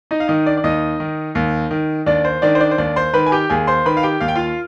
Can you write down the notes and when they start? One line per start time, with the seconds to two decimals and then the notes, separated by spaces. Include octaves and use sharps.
0.11 D#4 D#5
0.20 F5
0.28 D#3 D#4 D#5
0.46 D4 D5
0.57 D5
0.64 D#2 D#4 D#5
1.00 D#3
1.35 D#2
1.71 D#3
2.06 D#2 D4 D5
2.25 C5
2.42 D#3 D4 D5
2.55 C5
2.60 D4 D5
2.71 C5
2.78 D#2 D4 D5
2.96 C5 C6
3.14 D#3 B4 B5
3.26 G#5
3.32 G4 G5
3.50 D#2 G#4 G#5
3.67 C5 C6
3.85 D#3 B4 B5
3.97 F5
4.03 G4 G5
4.20 D#2 F5
4.28 G5
4.35 F4 F5